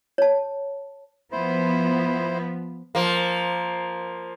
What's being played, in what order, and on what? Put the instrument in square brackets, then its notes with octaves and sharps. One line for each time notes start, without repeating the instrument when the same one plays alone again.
[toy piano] C#5 A5
[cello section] F3 B3 [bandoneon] E4 C5
[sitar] F3 A#3